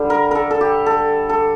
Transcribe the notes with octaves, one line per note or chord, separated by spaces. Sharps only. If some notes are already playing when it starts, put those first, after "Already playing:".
Already playing: D3 G3
A#4
A4 A#4
A4
G4
A4
A4